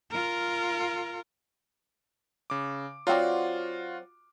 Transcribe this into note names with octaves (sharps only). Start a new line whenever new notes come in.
F4 A#4
C#3 D6
F#3 C4 F4 F#4 D5